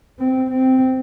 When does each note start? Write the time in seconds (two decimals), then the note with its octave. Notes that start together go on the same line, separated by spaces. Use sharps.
0.19 C4
0.50 C4